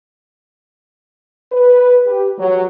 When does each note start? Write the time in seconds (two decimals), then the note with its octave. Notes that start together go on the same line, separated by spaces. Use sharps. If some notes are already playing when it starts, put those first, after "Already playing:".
1.52 B4
2.06 G4
2.39 F#3